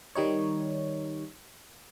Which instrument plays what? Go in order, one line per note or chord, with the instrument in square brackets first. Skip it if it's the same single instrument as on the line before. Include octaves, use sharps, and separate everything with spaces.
[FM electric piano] D#3 G3 D#4 C#5